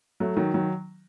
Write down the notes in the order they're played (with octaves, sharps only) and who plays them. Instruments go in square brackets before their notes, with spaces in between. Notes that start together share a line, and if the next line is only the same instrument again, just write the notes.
[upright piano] F#3 A3
D#3 F#3
D#3 F#3